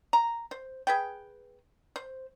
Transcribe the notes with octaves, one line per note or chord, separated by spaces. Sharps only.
A#5
C5
G#4 B4 G5
C5